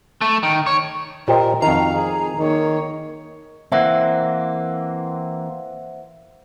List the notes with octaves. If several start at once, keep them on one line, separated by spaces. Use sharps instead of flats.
A3
D#3
C#5
A#2 G4 A#4 C5 D#5
F2 D#3 F#4 F5 A#5
G#4
D#3 A#3 C#5
E3 A#3 C4 C5 E5 F#5